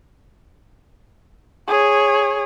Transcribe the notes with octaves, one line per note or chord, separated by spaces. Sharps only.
G#4 C#5